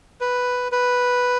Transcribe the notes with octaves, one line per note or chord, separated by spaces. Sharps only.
B4
B4